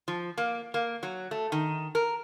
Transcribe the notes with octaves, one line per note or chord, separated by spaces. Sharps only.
F3
A#3
A#3
F#3
A3
D#3
A#4